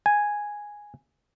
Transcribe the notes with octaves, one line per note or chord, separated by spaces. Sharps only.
G#5